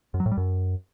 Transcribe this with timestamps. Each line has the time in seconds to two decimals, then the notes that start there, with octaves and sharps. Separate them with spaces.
0.14 F#2
0.20 F#3
0.26 A2
0.32 G3
0.37 F#2